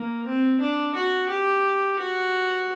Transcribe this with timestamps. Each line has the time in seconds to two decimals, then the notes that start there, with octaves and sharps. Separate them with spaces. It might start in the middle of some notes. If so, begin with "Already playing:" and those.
Already playing: A#3
0.26 C4
0.61 D4
0.95 F#4
1.29 G4
1.99 F#4